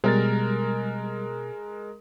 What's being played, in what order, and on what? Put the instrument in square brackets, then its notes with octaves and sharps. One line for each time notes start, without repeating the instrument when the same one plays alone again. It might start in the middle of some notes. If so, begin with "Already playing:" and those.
[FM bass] B2 [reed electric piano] G3 [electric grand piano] G#3 A#4 A6